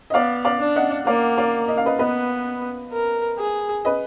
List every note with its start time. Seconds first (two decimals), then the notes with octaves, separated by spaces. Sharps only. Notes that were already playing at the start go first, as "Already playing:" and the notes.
0.10 D#5
0.14 B3 D5 F5
0.45 D5 F5
0.60 D4
0.76 D#5 F#5
1.06 A#3 D5 F5
1.38 D5 F5
1.68 D#5
1.77 F5
1.86 B4 D#5
1.99 B3 B4 D#5
2.92 A#4
3.39 G#4
3.85 B4 D#5